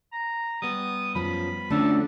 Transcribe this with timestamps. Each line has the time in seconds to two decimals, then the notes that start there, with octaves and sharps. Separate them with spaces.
0.12 A#5
0.62 G3 B3 D#6
1.15 F#2 F3 B5
1.71 D3 F3 A3 C#4 D4 A4